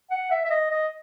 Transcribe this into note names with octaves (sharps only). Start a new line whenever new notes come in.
F#5
E5
E5
D#5
D#5